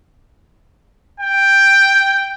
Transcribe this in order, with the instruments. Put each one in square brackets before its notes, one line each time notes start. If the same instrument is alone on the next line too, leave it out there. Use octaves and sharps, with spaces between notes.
[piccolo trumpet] G5